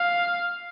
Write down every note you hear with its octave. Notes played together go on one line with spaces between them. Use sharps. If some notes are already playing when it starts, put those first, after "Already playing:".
Already playing: F5